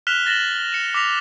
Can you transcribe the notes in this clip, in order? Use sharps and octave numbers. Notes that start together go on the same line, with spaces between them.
F6 F#6 B6 E7 F7 G7
A6 A#6 E7 F#7 G7
C#7 E7
D6 A#6 B6 F7